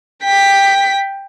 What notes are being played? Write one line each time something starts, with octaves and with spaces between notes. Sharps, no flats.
G5 B6